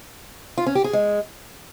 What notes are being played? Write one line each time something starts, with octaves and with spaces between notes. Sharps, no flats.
F4
C#4
G4
G#4
G#3